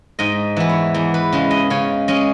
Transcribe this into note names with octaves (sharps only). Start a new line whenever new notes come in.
G#2 D#5
E3 B3
C#5
E2
B4
C#3 G#3
D#5
C#3 C#5
G#3 C#4 D#5